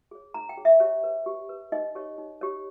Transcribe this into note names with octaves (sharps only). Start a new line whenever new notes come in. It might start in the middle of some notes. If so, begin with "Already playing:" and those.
G#4 C#5
D#4 A#5
G5
G#4 C#5
E5
G4 C#5
B4
G4
B4
D#4 D#5
G4 C#5
D#4
G4 C#5